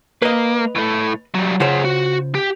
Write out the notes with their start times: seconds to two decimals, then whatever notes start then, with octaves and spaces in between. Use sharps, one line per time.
0.22 A#3 B4 D#5
0.75 A2 A3
1.35 F#3 G3
1.60 C#3 F4 G#4 C5 F#5
1.85 F#4
2.35 G4